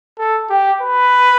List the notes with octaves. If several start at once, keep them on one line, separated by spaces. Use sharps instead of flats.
A4
G4
B4